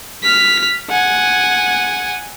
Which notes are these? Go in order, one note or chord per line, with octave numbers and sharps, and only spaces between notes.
F6 B6
F#5 G#5